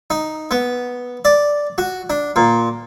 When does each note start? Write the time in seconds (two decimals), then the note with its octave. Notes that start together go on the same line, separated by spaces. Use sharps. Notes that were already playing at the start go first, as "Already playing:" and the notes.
0.10 D#4
0.51 B3
1.25 D5
1.78 F#4
2.10 D4
2.36 A#2